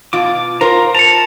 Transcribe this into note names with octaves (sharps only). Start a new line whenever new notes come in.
B2 F4 D6
F4 A#4 C5 A#5
A5 C#7 F7